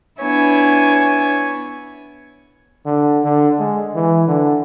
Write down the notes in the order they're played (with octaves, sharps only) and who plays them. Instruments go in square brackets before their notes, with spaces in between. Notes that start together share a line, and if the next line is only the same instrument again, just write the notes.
[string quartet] B3 D4 E4 C#5 G#5
[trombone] D3
D3
G#3
E3
D3